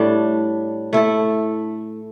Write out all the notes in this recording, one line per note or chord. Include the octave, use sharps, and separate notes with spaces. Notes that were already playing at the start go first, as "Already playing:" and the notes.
Already playing: A2 G3 D4
A3 E4 A4